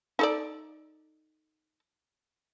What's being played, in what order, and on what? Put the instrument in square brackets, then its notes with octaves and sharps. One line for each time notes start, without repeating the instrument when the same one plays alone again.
[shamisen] D#4 A4 D5